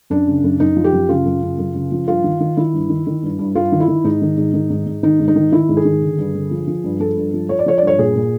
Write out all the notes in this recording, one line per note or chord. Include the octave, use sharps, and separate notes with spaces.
F#2 D4
C#3
F#2
F#2 D#4
F3
G4
F#2
C#3 F4
F#2
C#3
F#2
C#3
F3
G2 F4
D#3
D#3
D#3 E4
G2
D#3
D#3
G2
G2
G2 F4
D#3
E4
D#3
G#2 D#4
D#3
G#2
D#3
G#2
G#2
D#3 D#4
G#2
D#4
D#3
D#3 E4
G#2
G#4
D#3
D3
G2
D3
F3
F3
G2
F3 A4
G2
F3
F3 C#5
D5
F3 C#5
D5
G2 C#5
A#2 G#4
A#2